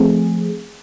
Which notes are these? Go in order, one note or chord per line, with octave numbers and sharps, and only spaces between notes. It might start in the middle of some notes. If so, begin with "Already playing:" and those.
Already playing: F3 A3 C4 G#4